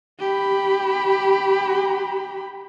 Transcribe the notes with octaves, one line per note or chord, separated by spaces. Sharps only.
G4 B5